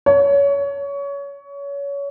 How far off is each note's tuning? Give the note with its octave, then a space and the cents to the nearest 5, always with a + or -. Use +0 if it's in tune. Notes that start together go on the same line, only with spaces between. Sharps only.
C#5 +25